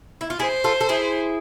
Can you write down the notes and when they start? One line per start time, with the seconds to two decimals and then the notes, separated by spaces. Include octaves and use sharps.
0.21 E4
0.30 F4
0.39 E4 G#4 C5
0.64 F4 A4
0.81 A4
0.89 E4 G#4